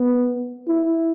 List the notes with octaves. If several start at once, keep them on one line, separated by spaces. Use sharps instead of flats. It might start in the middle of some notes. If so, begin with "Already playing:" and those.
Already playing: B3
E4